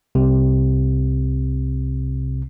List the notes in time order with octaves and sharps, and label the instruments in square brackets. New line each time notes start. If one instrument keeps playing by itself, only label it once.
[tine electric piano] C2 C3